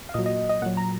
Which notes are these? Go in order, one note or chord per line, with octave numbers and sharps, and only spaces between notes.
F5
A#2 F#3 D#5
D#5
D#5
A#2 F#3 F#5
A#5